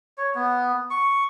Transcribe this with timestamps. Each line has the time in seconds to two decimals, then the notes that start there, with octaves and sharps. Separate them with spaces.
0.18 C#5
0.35 B3
0.90 C#6